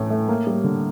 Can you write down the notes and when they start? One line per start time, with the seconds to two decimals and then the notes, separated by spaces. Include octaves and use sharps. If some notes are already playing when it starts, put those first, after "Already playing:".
Already playing: A2 E3 A3
0.10 A3
0.28 A#3
0.47 G3
0.64 D3